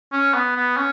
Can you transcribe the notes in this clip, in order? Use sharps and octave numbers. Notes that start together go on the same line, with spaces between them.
C#4
B3
B3
C#4